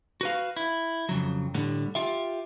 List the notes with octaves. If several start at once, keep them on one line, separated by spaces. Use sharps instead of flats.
F#4 B4 F5
E4
F2 C#3 F#3
A2 D3 G3
F4 G4 E5